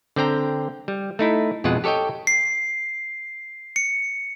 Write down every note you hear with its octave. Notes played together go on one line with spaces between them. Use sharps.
D3 C4 G5 A#5
G3
A3 D#4 E4
F2 B2 G#3 F4 F#5
G4 A4 C#5 D#5 G5
C7
C#7